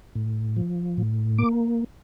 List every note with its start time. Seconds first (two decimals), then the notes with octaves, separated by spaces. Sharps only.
0.15 A2
0.57 F3
0.97 A2
1.38 A#3 D6